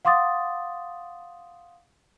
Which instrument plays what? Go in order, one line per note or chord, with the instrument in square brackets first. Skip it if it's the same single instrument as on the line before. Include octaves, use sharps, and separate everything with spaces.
[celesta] F5 F#5 C6 D6 D#6 A6